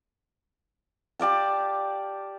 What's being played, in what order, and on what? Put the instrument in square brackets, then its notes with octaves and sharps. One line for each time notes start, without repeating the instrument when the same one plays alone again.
[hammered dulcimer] G4 D5 F5 A5